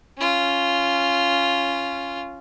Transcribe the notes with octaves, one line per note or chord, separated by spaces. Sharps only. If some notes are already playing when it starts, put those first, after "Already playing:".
C#4 F4